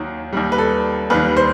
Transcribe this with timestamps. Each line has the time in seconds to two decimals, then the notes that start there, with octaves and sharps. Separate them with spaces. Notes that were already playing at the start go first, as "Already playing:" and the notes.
Already playing: D#2 D#3 F#3
0.33 D#2 D#3 G3
0.52 B4
0.58 A4
1.10 D#2 D#3 G3 B4
1.37 C5